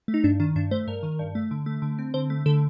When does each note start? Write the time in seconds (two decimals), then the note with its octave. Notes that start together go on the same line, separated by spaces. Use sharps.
0.08 A3
0.14 D#4
0.24 G2 D4
0.40 D#3 D4
0.56 G2 D4
0.71 A3 C5
0.87 G2 A#4
1.03 D#3
1.19 G2
1.35 A3
1.51 D3
1.66 A3
1.82 D3
1.98 C4
2.14 D3 C5
2.30 A3
2.46 D3 A4